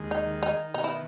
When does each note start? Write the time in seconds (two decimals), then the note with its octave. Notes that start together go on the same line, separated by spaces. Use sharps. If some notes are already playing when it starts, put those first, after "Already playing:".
Already playing: D#2 G#3
0.11 D#4
0.26 D#3
0.43 D#4
0.74 B2 D#4
0.84 E4